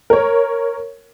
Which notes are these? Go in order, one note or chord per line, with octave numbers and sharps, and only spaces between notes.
A#4 C#5